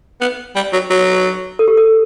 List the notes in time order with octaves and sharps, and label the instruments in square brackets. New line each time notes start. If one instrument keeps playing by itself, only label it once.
[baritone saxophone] B3
G3
F#3
F#3
[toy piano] A4
G4
A4